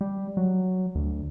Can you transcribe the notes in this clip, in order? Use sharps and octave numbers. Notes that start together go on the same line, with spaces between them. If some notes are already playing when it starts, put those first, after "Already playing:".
G3
F#3
D2